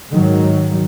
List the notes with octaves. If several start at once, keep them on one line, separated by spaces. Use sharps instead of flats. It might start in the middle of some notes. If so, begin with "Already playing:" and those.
G#2 D#3 F#3